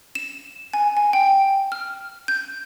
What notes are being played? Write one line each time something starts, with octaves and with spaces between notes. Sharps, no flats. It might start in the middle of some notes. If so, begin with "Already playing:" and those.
E7
G#5
G#5
G5
F6
G6